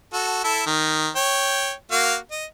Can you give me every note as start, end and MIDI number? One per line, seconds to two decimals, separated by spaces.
0.13 0.41 66
0.13 0.41 69
0.44 0.62 64
0.44 0.62 69
0.66 1.09 51
1.16 1.72 73
1.16 1.72 79
1.91 2.16 58
1.91 2.16 66
1.91 2.16 77
2.31 2.45 75